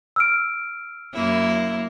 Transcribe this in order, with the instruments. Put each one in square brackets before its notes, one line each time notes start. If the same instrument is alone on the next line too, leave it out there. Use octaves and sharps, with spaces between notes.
[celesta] E6 F6 D7
[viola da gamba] F#2 A#3 E4